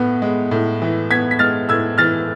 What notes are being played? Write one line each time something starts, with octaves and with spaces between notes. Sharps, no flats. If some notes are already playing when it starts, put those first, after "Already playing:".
Already playing: A2 B3
G#3
A2
E3
B3 G#6 B6
B6
G#3 F6 A6
A2 E6 G#6
E3 F6 A6